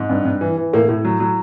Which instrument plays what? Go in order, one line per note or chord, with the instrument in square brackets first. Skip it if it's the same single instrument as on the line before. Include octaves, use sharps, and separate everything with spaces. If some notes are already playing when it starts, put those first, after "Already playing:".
Already playing: [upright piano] G#2
G2
G2
E3
E3
A2 A#3
A2
F#3
F#3